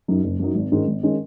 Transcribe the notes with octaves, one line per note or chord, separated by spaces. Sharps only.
F#2 F#3 D#4
F#1
F#2 F#3 D#4
G#1
G#2 D#3 G#3 C#4
G#1
D#3 G#3 C#4